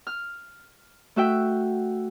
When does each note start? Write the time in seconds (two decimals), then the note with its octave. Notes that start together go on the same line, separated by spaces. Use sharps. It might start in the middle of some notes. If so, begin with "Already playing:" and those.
0.07 F6
1.16 A3 F#4 E5 G5